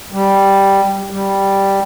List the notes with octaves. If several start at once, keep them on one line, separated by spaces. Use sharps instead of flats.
G3
G3